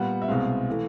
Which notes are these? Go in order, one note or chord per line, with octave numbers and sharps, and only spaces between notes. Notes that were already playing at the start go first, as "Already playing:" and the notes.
Already playing: A#2 G3 B3 F#5
E5
C2 B2 G#3 C4 F5
E3 A3